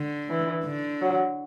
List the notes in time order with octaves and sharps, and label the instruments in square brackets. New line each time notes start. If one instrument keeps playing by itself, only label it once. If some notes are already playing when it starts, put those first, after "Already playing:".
Already playing: [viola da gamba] D3
[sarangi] E3
[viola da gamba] D3
[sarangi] F#3